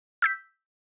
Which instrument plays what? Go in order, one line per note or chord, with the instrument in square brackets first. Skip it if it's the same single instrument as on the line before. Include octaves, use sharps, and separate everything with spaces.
[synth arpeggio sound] E6 G6 B6